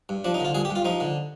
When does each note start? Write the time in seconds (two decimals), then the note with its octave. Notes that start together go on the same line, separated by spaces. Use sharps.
0.09 G2
0.24 F3 D4
0.34 D#4
0.40 D3 F4
0.55 G2 G#4
0.65 G4
0.71 G2
0.76 F4
0.85 F3 D#4
1.00 D3